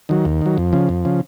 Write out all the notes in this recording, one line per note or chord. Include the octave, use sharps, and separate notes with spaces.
D#3 F#3
D#2
D#3 F#3
F2
C#3 F3
F2
C#3 F3